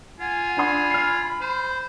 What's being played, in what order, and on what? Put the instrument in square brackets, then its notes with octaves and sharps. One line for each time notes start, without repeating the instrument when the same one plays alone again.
[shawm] F4 [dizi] F#5 [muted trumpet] G#5
[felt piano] D4 F#5 C6 [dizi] B5
[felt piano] F6 C7
[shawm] C5